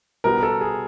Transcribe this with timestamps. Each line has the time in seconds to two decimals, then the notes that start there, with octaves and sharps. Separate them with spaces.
0.24 B2 G3 B3 A#4
0.43 A4
0.61 G#4